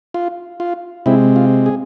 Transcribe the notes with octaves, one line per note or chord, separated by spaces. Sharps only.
F4
F4
C3 G#3 C4 E4
F4
G#4